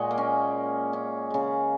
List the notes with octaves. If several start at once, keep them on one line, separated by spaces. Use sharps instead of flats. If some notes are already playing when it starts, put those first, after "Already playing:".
Already playing: A#2 G#3 C#5 D#5 F#5
A#3
C#4
C#4
C#3 G#3